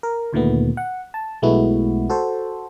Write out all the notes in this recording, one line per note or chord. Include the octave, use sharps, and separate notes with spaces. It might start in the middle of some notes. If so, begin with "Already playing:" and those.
A#4
D2 A#2 D#3 A3 B3
F#5
A5
B1 G#3 A3 B3 E4 F#4
F#4 A4 C5